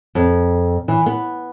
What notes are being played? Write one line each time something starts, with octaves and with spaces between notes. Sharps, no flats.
F2
E3
B3